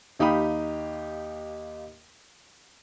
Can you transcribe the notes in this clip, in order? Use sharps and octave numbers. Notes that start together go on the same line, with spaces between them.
D#2 D#4 G4 F5 B5 D#6